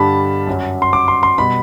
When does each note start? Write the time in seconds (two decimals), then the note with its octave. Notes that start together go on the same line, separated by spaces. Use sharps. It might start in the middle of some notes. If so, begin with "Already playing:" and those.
Already playing: G2 D3 G3 A5 B5
0.47 F#2 F#3
0.82 C6
0.93 D6
1.08 C6
1.23 C6
1.38 B2 G3 B5